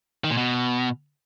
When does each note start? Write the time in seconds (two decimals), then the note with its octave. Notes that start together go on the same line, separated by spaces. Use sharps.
0.24 D#3
0.31 A#2
0.37 B2